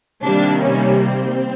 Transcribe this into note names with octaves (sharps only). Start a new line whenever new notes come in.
C3 D#3 G3 A#3 D4
C#4
C4